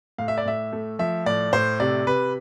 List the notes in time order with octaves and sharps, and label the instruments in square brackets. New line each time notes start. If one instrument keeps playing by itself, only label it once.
[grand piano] A2 F5
E5
D5
A2 E5
A3
F3 E5
A2 D5
A2 C5
C3 D5
C3 B4